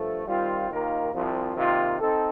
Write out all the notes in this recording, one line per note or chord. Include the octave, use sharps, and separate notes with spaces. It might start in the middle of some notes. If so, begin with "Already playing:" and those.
Already playing: G2 F3 A3
D#3 G3 C4 F4
D#2 D#3 A#3 F4 A#4
C2 C3 F3
C3 D#3 A#3 F4
C4 D#4 A4